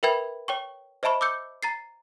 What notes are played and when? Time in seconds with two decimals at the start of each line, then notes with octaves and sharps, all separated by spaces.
0.03 A#4 B4 E5 G5 B5 G#6
0.48 C#5 G5 C#6
1.03 C5 D#5 E5 A5 B5 C#6
1.21 D6 E6 G6 C#7
1.63 A#5 A6 C7